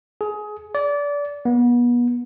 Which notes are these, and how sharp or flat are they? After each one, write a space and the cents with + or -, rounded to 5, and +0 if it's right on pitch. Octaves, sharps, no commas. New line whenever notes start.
G#4 +20
D5 -25
B3 -35